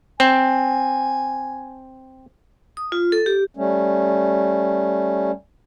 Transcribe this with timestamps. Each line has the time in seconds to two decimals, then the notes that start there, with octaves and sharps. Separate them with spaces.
0.20 C4 G#5
2.77 D#6
2.92 F4
3.12 A4
3.26 G4
3.57 G3 A3 C#4